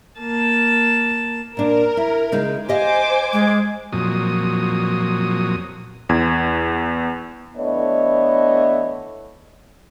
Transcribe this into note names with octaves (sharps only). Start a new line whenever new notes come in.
A#3 A5
A#2 D4 A#4
E4
C#3 G#3 D#4
G4 C5 D#5 F5 G#5 D6
G#3
F2 A#2 F#3 D#6
E2 G#6
E3 A3 B3 D4 C#5 D#5